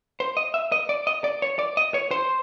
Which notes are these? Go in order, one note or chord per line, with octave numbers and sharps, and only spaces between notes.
C5
D#5
E5
D#5
D5
D#5
D5
C#5
D5
D#5
C#5
C5